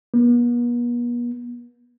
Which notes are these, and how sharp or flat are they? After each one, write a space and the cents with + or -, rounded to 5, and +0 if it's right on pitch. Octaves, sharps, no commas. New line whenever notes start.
B3 -45